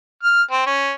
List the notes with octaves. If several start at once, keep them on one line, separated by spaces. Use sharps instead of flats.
F6
C4
C#4